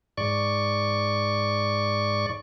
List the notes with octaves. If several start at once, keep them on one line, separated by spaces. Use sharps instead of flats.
G#2 D5 C#6